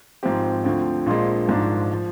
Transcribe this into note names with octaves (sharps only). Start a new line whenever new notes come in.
G#1 G#2 F3 C4 G4
D2 D3 F3 C4
A#1 A#2 F3 G#3
G#1 G#2 F3 G#3 D4
F3